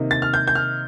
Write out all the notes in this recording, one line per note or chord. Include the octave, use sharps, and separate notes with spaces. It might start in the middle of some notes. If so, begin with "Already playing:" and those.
Already playing: C3 D#3 A#3 D#4
A6
F6
G6
G6
F6